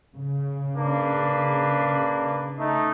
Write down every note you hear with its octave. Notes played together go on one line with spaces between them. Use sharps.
C#3
A#3 D4 B4
A3 D#4